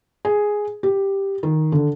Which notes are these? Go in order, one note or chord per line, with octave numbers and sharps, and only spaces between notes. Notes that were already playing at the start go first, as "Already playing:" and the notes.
G#4
G4
D#3
D3